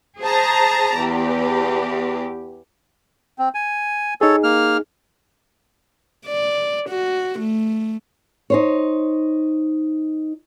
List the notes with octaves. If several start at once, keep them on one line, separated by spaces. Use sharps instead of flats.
G#4 C5 A5 A#5
E2 G4
C4
G#5
D#4 G#4 A4 C#5
A#3 F6
D5
F#4
A3
D#4 C5 C#5